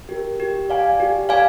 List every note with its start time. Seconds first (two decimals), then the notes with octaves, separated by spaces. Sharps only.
0.09 G4 A#4
0.40 G4
0.70 D5 F5 G#5
1.00 G4
1.29 D5 F5 G#5